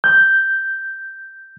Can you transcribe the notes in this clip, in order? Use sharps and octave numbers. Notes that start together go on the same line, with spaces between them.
G6